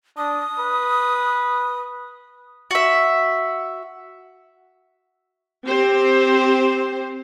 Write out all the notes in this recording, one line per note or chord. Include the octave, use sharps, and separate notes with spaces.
D4 D#6
B4
F#4 E5
C4 G4 C5